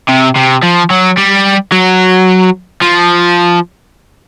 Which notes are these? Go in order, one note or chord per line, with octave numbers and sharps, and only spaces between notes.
C3
C3
F3
F#3
G3
F#3
F3